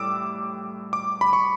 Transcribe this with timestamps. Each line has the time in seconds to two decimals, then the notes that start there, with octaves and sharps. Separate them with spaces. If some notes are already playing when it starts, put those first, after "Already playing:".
Already playing: A2 G3 D6 E6
0.93 D6
1.21 B5
1.33 C#6